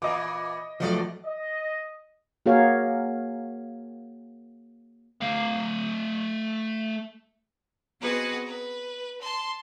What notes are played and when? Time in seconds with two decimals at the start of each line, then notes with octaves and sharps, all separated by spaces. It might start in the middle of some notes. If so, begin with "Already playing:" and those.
0.02 A#2 E3 D#5 D6
0.80 E2 F3 F#3 A3 D5 D#5
1.25 D#5
2.46 A#3 F#4 G#4 A#4 C#5 F5
5.21 A3 F5
8.01 B3 C4 F#4 G#4 B4 D#5
8.47 B4
9.21 A5 C6